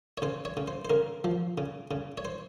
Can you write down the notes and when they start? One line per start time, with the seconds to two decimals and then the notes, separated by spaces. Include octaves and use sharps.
0.18 C#5
0.22 C#3 C5
0.45 C#5
0.57 C#3
0.68 C5
0.85 C5
0.90 C#3 A#4
1.24 F3
1.58 C#3
1.91 C#3
2.18 C#5
2.25 C5